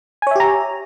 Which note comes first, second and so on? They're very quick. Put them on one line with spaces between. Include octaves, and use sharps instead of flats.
G#5 C#5 E5 G4 A#5